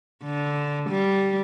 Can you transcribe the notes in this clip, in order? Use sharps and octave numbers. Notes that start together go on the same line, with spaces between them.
D3
G3